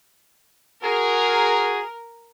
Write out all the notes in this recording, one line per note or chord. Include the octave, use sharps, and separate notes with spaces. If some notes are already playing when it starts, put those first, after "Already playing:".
F#4 G#4 A#4